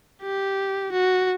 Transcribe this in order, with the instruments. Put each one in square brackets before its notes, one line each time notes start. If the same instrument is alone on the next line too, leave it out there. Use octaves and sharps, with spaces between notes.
[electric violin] G4
F#4